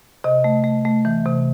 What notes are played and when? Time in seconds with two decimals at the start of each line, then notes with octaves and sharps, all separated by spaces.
0.24 C3 D#5
0.44 A3
0.64 A3
0.85 A3
1.05 E3
1.26 C3